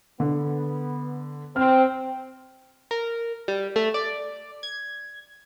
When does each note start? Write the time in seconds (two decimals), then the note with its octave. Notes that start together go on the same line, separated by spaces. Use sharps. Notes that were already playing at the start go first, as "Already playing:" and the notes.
0.20 D3 B3
1.56 C4 F6
2.91 A#4
3.48 G3
3.76 A3
3.94 D5
4.63 G#6